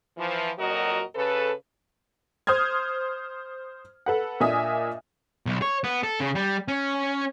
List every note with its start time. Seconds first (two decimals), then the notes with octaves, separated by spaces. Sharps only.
0.18 E3 F3
0.58 F2 A#2 F#3 F#4 A#4 D#5
1.15 C#3 A4 B4
2.47 C5 D#6 F6 G#6
4.06 A4 B4 F#5
4.40 A#2 D4 D#5 E5 G#5 D#6
5.46 B1
5.62 C#5
5.84 B3
6.03 A4
6.20 C#3
6.35 G3
6.68 C#4